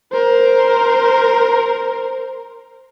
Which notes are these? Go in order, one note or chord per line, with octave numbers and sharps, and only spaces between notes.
A#4 C5